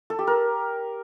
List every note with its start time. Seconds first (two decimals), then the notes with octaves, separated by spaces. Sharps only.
0.10 A4
0.19 G4
0.27 A#4